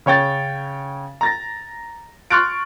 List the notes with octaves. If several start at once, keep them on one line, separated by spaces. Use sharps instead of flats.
C#3 C#5 G5 A6
A#5 A6 A#6
C6 C#6 F6 F#6 A6 D7